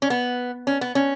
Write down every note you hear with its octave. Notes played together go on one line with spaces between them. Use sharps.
C#4
B3
C#4
B3
C#4